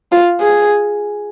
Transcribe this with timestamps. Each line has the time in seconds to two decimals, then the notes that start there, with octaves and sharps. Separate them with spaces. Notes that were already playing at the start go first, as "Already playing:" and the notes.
0.12 F4
0.41 G#4